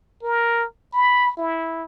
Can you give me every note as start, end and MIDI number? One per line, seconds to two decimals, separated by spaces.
0.23 0.65 70
0.93 1.34 83
1.37 1.84 64